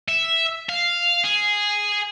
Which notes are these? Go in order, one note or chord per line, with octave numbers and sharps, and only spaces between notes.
E5
F5
G#4